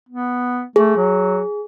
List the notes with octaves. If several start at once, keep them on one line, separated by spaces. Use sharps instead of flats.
B3
A3 G#4
F#3